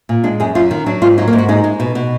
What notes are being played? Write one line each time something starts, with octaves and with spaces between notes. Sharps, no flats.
A#2
G#3 D4
F#2 G#4
F#2 F4
D#3
F#3 D4
G#2 F4
F#3 D#4
A#3
G#2
F#4
G#3 D#4
G#3
B2
B2